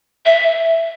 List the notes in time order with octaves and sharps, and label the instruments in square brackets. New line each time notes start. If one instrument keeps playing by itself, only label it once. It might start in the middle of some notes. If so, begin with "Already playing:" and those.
[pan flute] E5